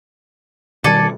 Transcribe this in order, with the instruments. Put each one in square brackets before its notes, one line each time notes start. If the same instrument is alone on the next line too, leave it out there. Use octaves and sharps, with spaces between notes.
[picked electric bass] B2 D#3 G3 [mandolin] A4 D5 G#5